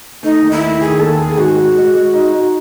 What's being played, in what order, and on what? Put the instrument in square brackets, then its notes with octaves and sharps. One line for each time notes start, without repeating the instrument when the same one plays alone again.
[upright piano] A3 [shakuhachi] D#4
[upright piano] D#2
[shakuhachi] E4
[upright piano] A3
[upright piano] D#3 [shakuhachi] G#4
[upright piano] D#2 [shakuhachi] A4
[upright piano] D#2 [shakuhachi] G#4
[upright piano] G#2 [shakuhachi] F#4
[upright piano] G#3
G#3
G#3
D#4
D#4